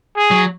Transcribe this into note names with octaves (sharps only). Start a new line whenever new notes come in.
G#4
F#3